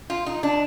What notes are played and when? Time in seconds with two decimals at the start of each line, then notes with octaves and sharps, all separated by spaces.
0.10 F4
0.26 D#4
0.43 D4